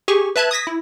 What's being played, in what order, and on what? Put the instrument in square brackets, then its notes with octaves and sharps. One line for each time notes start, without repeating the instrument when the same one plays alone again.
[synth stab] G4 G#4 G#5 C#6
B4 E5 A5 F#6 G#6
D#6 G#6 A#6 B6
E4